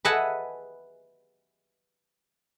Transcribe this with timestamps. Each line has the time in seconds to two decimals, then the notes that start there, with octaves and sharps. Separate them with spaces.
0.05 B4 D#5 E5 F#5 G#5 A5